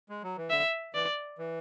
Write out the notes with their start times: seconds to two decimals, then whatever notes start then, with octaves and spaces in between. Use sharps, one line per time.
0.09 G#3
0.23 F#3
0.37 E3
0.50 D3 E5
0.94 E3 D5
1.38 E3